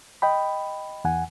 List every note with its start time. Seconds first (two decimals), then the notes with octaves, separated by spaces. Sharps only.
0.22 D#5 G5 B5
1.04 E2 F#5 G#5